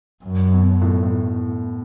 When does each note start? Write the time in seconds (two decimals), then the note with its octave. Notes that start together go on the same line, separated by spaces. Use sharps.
0.24 F#2
0.52 B2
0.82 A2
1.03 A2